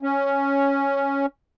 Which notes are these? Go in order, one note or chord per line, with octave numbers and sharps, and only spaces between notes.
C#4